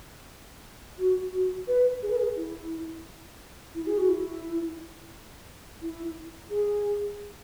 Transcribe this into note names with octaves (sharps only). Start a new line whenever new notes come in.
F#4
F#4
B4
G#4
B4
G#4
E4
E4
G#4
F#4
E4
E4
G#4